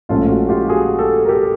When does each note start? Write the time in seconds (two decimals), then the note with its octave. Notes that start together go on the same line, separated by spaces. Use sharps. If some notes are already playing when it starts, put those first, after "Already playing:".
0.09 A#1 G#2 F3 A3 C#4 F4
0.29 F#4
0.49 F4 G4
0.69 F#4 G#4
0.99 G4 A4
1.25 A#4
1.29 G4 A4